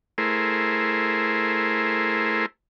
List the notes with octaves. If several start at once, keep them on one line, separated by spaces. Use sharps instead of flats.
A3 E4 G#4 A#4 C5